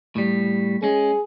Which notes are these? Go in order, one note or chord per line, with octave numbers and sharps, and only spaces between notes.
A2 G3
G#3 C#4 G#4